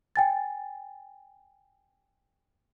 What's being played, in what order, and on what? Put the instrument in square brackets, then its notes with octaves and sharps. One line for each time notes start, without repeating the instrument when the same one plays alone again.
[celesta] G5 G#5 A6